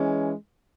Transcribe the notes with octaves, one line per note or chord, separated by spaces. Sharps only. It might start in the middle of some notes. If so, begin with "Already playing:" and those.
Already playing: E3 G#3 C#4